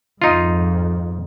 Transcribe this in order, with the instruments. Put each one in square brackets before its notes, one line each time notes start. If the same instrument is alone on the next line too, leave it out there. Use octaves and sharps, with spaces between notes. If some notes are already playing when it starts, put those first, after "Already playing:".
[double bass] F2 G#2 [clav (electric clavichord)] D#4 F4